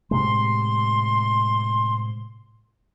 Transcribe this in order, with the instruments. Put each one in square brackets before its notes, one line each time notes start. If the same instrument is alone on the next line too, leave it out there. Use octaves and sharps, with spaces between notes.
[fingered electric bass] A2 C3 G#3 [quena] C6